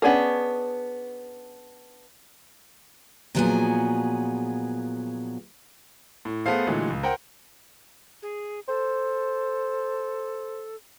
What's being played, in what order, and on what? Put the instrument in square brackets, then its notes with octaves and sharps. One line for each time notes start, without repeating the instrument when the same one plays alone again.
[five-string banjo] B3 C#4 D4 G#4 A#4
[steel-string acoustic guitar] A#2 F3 F#3 B3 G#4 G#5
[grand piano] A2
A3 B3 G#4 A4 C5 F5
A#2 D3 E3 F#3 G#3 A3
C#2
A#4 C5 F#5 G5
[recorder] G#4
[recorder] A4 [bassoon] C5